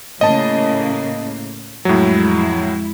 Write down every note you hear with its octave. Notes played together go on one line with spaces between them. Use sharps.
A2 C#3 A#3 D#5 A5
F2 A2 F#3 G#3 E4